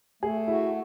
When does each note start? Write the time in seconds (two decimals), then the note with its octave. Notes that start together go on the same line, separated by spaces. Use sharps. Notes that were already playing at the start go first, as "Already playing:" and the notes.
0.23 A3 G#4
0.48 E4 F#4